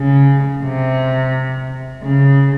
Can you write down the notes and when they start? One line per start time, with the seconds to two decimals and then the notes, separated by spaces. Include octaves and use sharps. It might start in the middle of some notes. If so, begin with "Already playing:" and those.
Already playing: C#3
0.64 C3
2.03 C#3